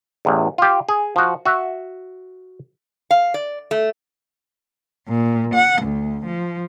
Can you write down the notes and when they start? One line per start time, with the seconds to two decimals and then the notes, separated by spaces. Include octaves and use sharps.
0.25 A1 E2
0.58 F4 G4
0.89 G#4
1.16 F3 F#4
1.46 F#4 E5
3.11 F5
3.34 D5
3.71 A3
5.08 A#2
5.53 F#5
5.82 D2
6.24 F3